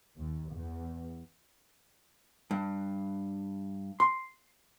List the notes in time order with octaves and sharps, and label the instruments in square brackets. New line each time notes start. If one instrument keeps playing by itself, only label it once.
[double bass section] D#2
E2
[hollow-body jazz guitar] G2
C6